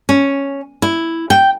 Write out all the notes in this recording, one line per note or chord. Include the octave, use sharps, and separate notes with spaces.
C#4
E4
G5